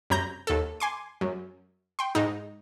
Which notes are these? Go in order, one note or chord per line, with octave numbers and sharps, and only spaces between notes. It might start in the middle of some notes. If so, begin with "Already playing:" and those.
F#2 C3 A#5 G6
D#2 A4
G#5 C6 D6
F#2
G5 C6
G#2 D#4